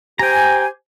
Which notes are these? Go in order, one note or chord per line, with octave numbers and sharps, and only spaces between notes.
G4 C5 G5 G#5 A#5